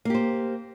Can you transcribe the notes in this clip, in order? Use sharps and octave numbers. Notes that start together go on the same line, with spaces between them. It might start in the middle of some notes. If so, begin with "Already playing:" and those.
A#3 G4 C5